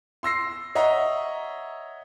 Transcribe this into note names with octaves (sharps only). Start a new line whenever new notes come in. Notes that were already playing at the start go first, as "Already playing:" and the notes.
C6 E6 A#6 C7
C#5 D#5 E5 F#5 A#5